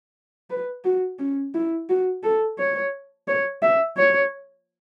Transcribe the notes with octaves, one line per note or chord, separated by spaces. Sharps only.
B4
F#4
C#4
E4
F#4
A4
C#5
C#5
E5
C#5